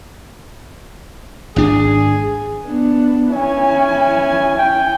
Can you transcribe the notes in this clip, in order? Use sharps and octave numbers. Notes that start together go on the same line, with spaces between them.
G#1 D4 G#4
B3 D4
C#4 E4 G#5
G5